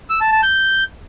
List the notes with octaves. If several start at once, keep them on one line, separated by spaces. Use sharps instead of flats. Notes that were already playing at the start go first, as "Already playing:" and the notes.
E6
A5
A5
G6